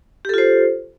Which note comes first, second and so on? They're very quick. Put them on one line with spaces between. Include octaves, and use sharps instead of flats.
G4 A4 F4 C5